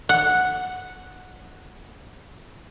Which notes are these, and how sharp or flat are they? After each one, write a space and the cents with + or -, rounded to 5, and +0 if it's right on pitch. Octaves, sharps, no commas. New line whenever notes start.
F#5 -5